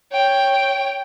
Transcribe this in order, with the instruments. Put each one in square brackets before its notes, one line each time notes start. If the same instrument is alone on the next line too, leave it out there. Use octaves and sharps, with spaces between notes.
[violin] C#5 G5